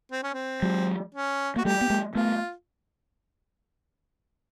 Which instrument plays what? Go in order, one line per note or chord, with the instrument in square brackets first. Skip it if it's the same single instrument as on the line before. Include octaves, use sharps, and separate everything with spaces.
[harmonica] C4
C#4
C4
[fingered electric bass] F#3 G#3
[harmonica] C#4
[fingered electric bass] A#3 [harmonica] F#4
[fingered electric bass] G3 A3 [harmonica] G4
[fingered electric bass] B3
G#3 A#3
[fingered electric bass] A3 B3 [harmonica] F4